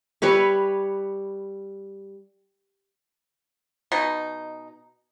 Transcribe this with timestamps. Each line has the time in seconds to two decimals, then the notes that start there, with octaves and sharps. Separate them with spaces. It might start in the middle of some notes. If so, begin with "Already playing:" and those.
0.22 G3 B4 C#5 E5
3.92 B2 D#4